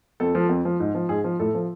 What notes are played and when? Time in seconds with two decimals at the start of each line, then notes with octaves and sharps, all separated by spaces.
0.20 F2 A4
0.35 F3
0.49 F2
0.65 F3
0.80 G#2
0.95 F3
1.09 G#2 G#4
1.24 F3
1.39 A2 A4
1.55 F3